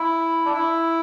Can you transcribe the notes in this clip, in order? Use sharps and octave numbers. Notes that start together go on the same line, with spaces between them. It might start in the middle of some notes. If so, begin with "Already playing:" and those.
Already playing: E4
D4
E4